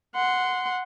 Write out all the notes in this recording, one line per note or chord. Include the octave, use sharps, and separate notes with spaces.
F#5 C6